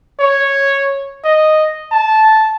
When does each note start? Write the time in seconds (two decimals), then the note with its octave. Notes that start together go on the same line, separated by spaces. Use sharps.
0.19 C#5
1.24 D#5
1.92 A5